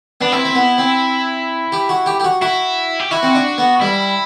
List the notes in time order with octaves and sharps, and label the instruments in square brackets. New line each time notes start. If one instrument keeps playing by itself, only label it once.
[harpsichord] B3 [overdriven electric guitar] D4
[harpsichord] C4 [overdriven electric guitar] E4
[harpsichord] C4
B3
C4
G4
F#4
G4
G4
F#4
[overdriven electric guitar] E4 [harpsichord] F#4
[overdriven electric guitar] G4
[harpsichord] E4 [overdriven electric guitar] F#4
[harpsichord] C4
D4
B3
[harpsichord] G3 [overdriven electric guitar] E4